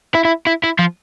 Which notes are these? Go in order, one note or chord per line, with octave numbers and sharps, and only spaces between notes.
E4
E4
E4
E4
F3